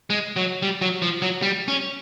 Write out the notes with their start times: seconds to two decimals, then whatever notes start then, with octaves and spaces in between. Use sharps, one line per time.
0.10 G#3
0.36 F#3
0.62 G3
0.82 F#3
1.02 F3
1.22 F#3
1.42 G3
1.68 C#4